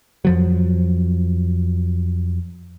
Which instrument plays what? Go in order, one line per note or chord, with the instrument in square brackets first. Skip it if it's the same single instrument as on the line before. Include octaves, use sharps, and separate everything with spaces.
[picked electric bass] F2 F3 F#3